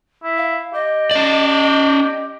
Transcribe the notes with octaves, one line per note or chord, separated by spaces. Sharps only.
E4
F5
G4 D#5
C#4 D5